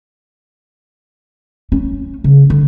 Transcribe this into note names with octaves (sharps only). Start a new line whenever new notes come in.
C#4
C#3
D3